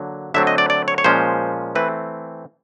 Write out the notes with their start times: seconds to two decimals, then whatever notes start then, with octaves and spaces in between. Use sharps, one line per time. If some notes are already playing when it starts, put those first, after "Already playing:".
Already playing: D3 F#3 A#3
0.34 D3 F#3 A3 C4 E5
0.47 D#5
0.58 D5
0.70 D5
0.88 C#5
0.98 C#5
1.04 A#2 F3 G#3 C#4 C5
1.75 E3 A3 C4 B4